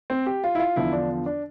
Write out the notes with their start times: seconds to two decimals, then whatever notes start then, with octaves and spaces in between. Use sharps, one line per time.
0.10 C4
0.26 G4
0.44 F4
0.55 E4
0.59 F4
0.76 E2 D3 F3 E4
0.93 D4
1.26 D4